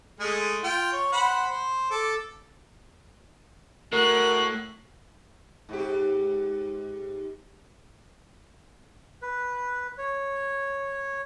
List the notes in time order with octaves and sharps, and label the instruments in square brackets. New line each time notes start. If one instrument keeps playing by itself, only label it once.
[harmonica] G#3 A3 G#4
F4 G5
C#5
C5 F#5 B5
C5
A4 D6
[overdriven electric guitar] A2 [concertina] F#4 [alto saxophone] A#4 [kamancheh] F#6
[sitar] G#2 G4
[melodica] B4
C#5